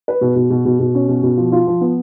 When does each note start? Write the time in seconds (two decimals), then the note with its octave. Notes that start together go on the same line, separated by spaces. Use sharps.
0.08 B4
0.21 B2
0.36 B2
0.50 B2
0.65 B2
0.80 B2
0.95 C#4
1.09 B2
1.23 B2
1.38 F3
1.52 F4
1.67 F3
1.81 B3